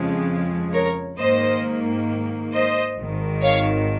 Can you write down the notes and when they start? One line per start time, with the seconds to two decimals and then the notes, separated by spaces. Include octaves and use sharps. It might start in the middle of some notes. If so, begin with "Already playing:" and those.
Already playing: F2 C#3 F3 G#3
0.72 A#4 C#5
1.17 G#2 D#3 A#3 C5 D#5
2.52 C5 D#5
2.98 G#1 G#2 D#3
3.42 C#5 F5